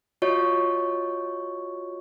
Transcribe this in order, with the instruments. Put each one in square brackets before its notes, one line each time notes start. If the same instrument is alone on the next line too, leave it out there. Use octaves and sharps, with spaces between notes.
[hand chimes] F4 F#4 C#5 D#5 C#6